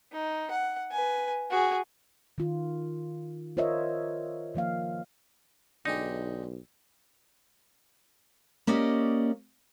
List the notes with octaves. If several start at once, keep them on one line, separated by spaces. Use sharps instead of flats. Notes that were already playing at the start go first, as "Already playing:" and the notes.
D#4
F#5
B4 G#5
F#4 G#4
D#3 F4
F4 A#4 C5 C#5 D#5 E5
D#3 F3 A#3 F5
B1 D3 G#3 D#4 G4
A#3 C#4 G4 D5 D#5